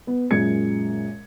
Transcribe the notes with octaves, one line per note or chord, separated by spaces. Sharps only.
B3
F#2 A#2 G#3 G#6 C#7